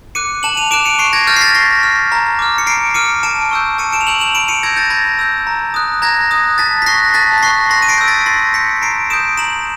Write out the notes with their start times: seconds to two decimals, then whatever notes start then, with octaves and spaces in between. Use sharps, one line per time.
0.15 D6 F#6 C#7 D#7
0.43 A5 E7 F#7
0.57 D#7 F7
0.71 D6 F#6 D7 E7
0.85 C#7 D#7
0.99 C#6 C7 D7
1.13 G#6 A#6
1.27 F6 G6 A6
1.36 C7
1.41 A6 B6
1.55 C#6 A#6 C7
1.83 F6
2.12 A#5
2.39 D6 F6
2.58 C#7
2.66 A#5 C7 D7
2.94 D6 F6 C#7 D#7
3.23 A5 D7 E7
3.51 C#6 E6 G6
3.78 A5 C#7 D#7
3.93 D7 E7
4.01 F7
4.07 C#6 E6 G6 E7 F#7
4.20 E7 F#7
4.35 B5 D7 E7
4.48 C#7 D#7
4.63 E6 G6 G#6 A#6
4.76 G6 A6
4.90 B5 G#6 A#6
5.19 E6 G6
5.47 A#5
5.74 D#6 F#6
6.02 A#5 G#6 A#6
6.31 D#6 F#6
6.58 A5 A6 B6
6.82 B6
6.86 C#6 F#6 A#6 C7
7.14 A5 A6 B6
7.38 B6
7.43 C#6 F#6 A#6 C7
7.70 C6 A#6 C7
7.82 D#7
7.89 C7 D7
7.98 E6 G6
8.08 A6 B6
8.26 C6 A#6 C7
8.54 E6 G6 B6 C#7
8.82 A#5 C7 D7
9.10 D#6 G6 D7 E7
9.37 A#5 E7 F#7